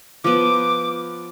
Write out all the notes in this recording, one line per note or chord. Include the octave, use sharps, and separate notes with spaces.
F3 B3 D6